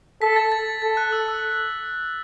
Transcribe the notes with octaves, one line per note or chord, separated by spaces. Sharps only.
A4 B6
A6
A6
A4 A6
F#6
E6
E6